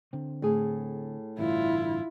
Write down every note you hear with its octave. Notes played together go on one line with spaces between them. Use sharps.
D3 C4
A2 G#4
A1 G2 D3 E4 F4